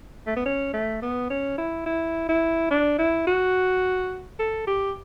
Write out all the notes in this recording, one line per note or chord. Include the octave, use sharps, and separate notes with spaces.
A3
B3
C#4
A3
B3
C#4
E4
E4
E4
D4
E4
F#4
A4
G4